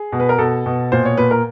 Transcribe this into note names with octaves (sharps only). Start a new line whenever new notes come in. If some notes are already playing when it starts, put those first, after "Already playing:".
Already playing: G#4
B2
B4
A#4
B2 A4
B2
A#2 C5
C#5
A#2 B4
A#4